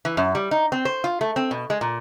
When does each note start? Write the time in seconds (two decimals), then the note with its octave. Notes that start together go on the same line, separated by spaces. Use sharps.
0.05 E3
0.17 F#2
0.35 G3
0.51 D#4
0.72 C4
0.85 C5
1.04 F4
1.21 A3
1.36 C4
1.51 B2
1.70 G#3
1.81 A#2